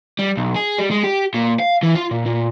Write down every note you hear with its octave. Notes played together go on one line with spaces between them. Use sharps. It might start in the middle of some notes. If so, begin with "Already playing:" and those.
G3
B1
G#4
G3
G#3
G4
A#2
F5
E3
F4
A#2
A#2